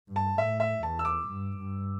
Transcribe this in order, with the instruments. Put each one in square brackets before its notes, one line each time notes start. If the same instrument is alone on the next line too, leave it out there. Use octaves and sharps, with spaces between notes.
[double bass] G2
[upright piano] A5
[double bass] A2 [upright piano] E5
[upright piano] E5
[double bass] E2 [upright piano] A5
[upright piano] E6
D6
[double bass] G2
G2